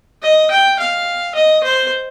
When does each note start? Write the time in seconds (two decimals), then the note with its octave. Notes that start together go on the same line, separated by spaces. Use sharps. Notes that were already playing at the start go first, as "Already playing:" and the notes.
0.23 D#5
0.51 G5
0.79 F5
1.35 D#5
1.64 C5